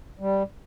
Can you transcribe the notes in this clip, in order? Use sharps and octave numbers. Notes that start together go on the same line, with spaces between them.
G3